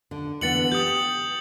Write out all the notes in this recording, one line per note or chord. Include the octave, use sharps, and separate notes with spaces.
D3
D3 E3 B3 A6 C#7 F#7
G4 D#6 G6